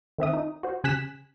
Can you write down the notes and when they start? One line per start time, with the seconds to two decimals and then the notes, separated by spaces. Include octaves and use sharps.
0.18 D#3 C4 E5 D#6
0.33 D#4
0.63 F#4 C5
0.84 C#3 G#5 F#6 B6 E7